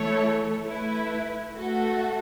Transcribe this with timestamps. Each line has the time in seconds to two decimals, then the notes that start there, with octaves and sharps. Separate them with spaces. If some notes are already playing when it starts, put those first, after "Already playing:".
Already playing: E3 A3 E4 A4 C#5
0.64 A3 E4 B4
1.56 A3 F#4 A4